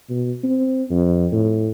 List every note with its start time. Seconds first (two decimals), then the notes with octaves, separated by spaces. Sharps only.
0.10 B2
0.44 C4
0.90 F2
1.32 A2